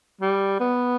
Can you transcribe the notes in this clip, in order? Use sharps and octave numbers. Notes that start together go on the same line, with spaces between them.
G3
B3